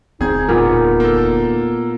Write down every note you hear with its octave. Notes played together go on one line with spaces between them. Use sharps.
E1 D2 C4 D#4 G#4 G#6
A#2 B3 A#4
A#3 A4